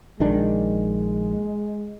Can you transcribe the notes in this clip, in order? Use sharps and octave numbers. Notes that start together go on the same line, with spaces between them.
A#1 D#3 G#3 D4